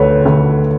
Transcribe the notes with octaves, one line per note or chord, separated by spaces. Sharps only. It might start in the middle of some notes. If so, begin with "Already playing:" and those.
Already playing: D2 D3 B4 C#5
D2